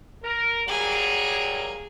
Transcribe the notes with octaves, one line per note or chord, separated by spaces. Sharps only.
A#4
F#3 G3 A#3 G#4